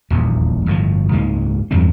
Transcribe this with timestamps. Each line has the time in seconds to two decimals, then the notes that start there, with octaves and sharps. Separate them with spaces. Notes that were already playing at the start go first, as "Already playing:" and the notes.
0.10 D#1 A#1 E2
0.66 G1 A2 C3 F3
1.12 C#2 G#2 G#3 A#3
1.71 E2 G2 G#3 C4